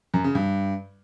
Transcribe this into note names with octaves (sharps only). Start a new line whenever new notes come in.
F#2
C#3
G2